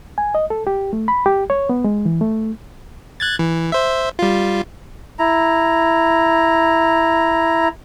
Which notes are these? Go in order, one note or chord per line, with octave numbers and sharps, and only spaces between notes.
G#5
D#5
A4
G4
A3
B5
G4
C#5
B3
G#3
E3
A3
F#6 G#6 A6
E3
C5 E5
G3 F4
E4 A#5